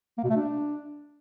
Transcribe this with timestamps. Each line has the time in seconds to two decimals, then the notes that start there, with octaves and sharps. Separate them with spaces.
0.18 A#3
0.24 B2
0.30 A3
0.36 D4